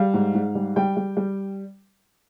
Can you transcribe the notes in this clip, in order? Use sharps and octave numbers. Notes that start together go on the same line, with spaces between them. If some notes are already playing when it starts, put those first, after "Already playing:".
Already playing: G3 F5
G#2
G#2
G3
G3 G5
G3
G3